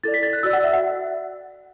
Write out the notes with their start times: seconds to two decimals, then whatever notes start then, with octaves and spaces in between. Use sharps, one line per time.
0.04 E4 A4 D5 A6
0.14 B6
0.23 A6
0.33 F#6
0.43 F#4 D5 E6
0.53 F#5
0.64 E5
0.73 F#5